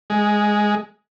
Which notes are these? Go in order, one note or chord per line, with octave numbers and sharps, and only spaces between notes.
G#3